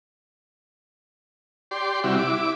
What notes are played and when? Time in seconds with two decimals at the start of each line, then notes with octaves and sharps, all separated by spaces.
1.71 G4 D5 C6
2.04 C3 G3 E4 F#4
2.17 E4 D6